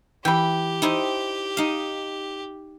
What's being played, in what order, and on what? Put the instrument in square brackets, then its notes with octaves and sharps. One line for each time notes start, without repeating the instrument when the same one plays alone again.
[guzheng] E3 [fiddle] G4 [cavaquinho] G5 B5
[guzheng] D#4 E4 C5
D#4 F5